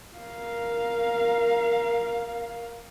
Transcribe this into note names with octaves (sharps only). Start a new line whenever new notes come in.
A#4 F5